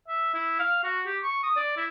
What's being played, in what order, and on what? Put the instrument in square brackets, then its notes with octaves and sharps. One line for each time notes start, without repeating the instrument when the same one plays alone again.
[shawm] E5
E4
F5
F#4
G4
C#6
D#6
D5
E4